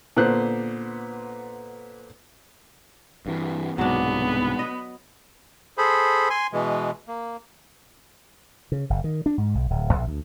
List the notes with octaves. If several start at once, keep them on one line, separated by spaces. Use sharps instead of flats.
A#2 D3 B3 C5 F#6
G2 E3
C2 G#2 B2 F#3 B3 D4
D#5
G#4 A4 C5 B5
G#5 C6
B2 E3 G#3
A#3
C#3
F#1
D#3
D4
G#2
B1
D1
A#1
D2